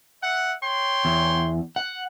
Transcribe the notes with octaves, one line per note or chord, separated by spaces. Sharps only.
E5 F#5
C#5 G5 C6
E2
F#5